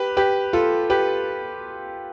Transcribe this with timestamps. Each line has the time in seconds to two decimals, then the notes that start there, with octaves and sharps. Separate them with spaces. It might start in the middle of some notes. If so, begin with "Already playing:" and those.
Already playing: G4 B4
0.17 G4 B4
0.53 F4 A4
0.90 G4 B4